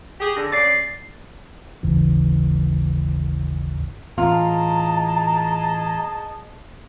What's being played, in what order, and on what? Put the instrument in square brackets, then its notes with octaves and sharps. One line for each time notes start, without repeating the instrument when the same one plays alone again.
[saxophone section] G4 G#4
[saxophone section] D3 [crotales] A#6
[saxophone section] C#3 D5 [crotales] A6 C7
[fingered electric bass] G#1 D#2 C#3 E3
[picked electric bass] A2 E3 B3 [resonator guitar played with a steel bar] F4 [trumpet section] G#4 D#5 A5 [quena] A#5